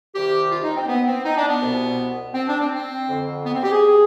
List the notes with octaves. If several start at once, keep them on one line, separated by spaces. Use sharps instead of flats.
C2 C3 D#3 G4
F4
D#4
C4
B3
C4
D#4
D4
B3
C2 B2
C4
D4
C4
C4
F2 D3
B3
C4
G4
G#4